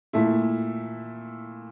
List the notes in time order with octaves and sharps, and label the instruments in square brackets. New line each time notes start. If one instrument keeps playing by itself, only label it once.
[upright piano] A#2 A3 E4